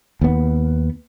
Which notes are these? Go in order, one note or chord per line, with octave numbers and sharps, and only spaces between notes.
D#2 B3